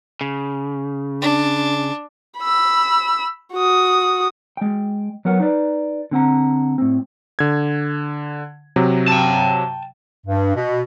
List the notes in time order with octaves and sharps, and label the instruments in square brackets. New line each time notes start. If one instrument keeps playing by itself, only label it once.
[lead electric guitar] C#3
[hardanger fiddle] D4
[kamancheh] B5 E6
F#4 D#6
[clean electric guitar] G#3 G5
F#3 B3 A#4 F#5
D#4 B4 D5
D3 C4 F#5 A#5
A2 C4
[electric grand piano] D3 G#6
C3 F#3
[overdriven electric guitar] G5 A5
[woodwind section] G2
B2